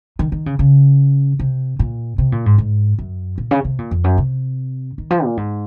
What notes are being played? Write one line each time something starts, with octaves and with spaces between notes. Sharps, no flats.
D#3
D#3
C#3
C#3
C3
A#2
C3
A#2
G#2
G#2
F#2
A#2
C#3
C3
A#2
F2
F#2
C3
D#3
F3
A#2
G#2